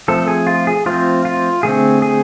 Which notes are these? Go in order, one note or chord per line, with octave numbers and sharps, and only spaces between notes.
F3 A3 C4 A4
G#4
F4
G#4
F3 A3 C4 F4
F4
D3 A3 C4 G#4
G#4